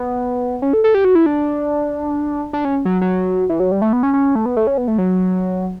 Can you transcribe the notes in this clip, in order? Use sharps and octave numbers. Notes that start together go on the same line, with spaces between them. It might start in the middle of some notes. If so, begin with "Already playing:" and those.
Already playing: B3
C#4
A4
A4
G4
F#4
E4
D4
D4
C#4
F#3
F#3
E3
F#3
G3
A3
B3
C#4
C#4
A3
B3
A3
C#4
B3
A3
F#3